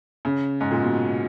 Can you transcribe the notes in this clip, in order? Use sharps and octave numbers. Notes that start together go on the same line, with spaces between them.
C#3
G#2
A#2
B2